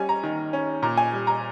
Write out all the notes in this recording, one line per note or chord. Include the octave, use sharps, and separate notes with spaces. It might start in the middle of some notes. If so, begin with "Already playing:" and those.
Already playing: G3 C#4 G#5
A#5
D#3
C#4
A#2 A#5
G#5
G3
A#5